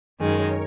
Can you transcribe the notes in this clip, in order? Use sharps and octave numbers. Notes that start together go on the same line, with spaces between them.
F#2 D#3 G#3 A#4 C#5